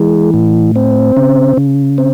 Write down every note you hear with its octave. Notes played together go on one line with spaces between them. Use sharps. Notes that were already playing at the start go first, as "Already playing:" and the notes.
Already playing: E3 G#3
A2
C4
C#3
C#3
C4